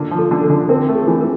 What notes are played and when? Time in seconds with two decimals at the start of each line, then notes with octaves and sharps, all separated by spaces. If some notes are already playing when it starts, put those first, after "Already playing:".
Already playing: D3 A#3
0.11 F3
0.18 A4
0.31 D3
0.44 A4
0.50 D3
0.69 C4 A#4
0.88 A3
0.95 G#4
1.07 E3
1.21 A#4